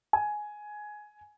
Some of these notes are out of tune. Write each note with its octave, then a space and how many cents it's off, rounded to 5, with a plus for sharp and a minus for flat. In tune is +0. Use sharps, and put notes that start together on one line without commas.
G#5 +10